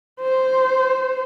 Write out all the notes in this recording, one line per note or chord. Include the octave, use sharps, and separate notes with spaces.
C5